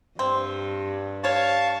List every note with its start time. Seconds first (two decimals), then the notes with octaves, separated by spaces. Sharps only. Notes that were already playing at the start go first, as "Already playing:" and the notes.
0.19 G2 C4
1.24 G3 C#5 F5 A5 C#6